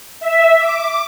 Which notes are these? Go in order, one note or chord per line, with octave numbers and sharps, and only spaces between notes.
E5
D6